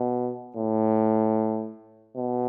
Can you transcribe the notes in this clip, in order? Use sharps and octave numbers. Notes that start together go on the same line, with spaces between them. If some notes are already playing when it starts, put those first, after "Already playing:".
Already playing: B2
A2
B2